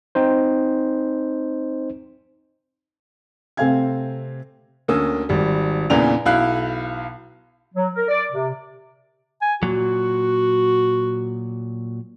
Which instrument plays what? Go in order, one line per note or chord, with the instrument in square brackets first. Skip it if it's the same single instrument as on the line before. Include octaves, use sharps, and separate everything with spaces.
[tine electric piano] C4 D#4 C5
[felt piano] C3 A3 C4 F5 G#5 G#6
[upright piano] D2 A#3 C#4 D#6 E6
G#1 G3
E2 A#2 C#3 E3 D4 F7
B1 E4 F5 F#6
[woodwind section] F#3
A#4
D5
C3
[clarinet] G#5
[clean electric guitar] A#2 F#3 [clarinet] F#4